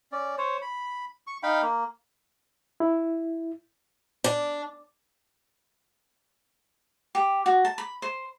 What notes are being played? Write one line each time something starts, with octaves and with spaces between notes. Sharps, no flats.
C#4 D5
C5 C#5
B5
C#6
D#4 F5 G5 B5
A#3
E4
D4
G4
F#4
A5
B5
C5